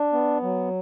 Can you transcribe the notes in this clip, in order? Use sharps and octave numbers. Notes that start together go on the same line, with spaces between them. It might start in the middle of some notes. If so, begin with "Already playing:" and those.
Already playing: D4
B3
F#3